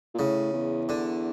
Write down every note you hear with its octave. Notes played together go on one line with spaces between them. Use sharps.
A#2
A2 C#3
E2
D3